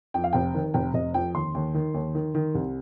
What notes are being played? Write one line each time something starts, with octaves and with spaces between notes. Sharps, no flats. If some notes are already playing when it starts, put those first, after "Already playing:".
F2 G5
F5
F1 G5
D#3
F1 G5
F1 D#5
F2 G5
D#2 C6
D#2
D#3
D#2
D#3
D#3
C2